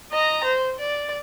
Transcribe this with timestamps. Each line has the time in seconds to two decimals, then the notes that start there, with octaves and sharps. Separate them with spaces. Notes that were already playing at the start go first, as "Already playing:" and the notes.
0.12 D#5 A#5
0.44 C5
0.79 D5